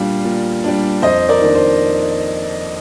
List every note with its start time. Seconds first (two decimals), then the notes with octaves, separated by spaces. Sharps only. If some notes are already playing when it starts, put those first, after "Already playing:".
Already playing: A#2 G3 D4 D5 F5
0.25 A#2
0.64 G3 D4
1.02 F2 C5 D#5
1.29 A#4 D5
1.42 D#3 A#3 D4
1.55 C5